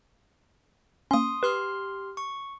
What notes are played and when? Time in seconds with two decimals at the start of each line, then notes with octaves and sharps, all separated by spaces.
1.11 A#3 C#4 C6 D#6
1.43 G4 B4 C6 F6
2.17 C#6